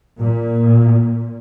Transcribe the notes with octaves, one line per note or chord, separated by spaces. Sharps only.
A#2